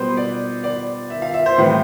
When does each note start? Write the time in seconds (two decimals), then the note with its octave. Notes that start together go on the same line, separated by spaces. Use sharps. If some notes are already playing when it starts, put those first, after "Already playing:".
Already playing: B2 G3 B3 B4 C5
0.17 D5
0.64 D5
1.10 E5
1.22 F5
1.34 E5
1.46 C5
1.58 A2 E3 G3 C4 B4